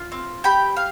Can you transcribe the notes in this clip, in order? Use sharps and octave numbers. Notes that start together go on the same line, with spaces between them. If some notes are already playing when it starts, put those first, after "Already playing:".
Already playing: F4
C4
G4 G5 B5
F5